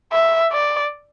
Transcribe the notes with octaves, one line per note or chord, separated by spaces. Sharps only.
E5
D5